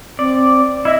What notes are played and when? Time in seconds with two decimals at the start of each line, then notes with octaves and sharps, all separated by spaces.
0.19 C4 D5
0.85 E4 D#5 E5